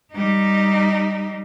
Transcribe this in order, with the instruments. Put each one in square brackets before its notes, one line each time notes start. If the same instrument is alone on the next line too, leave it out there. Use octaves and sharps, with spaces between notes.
[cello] G3 D#4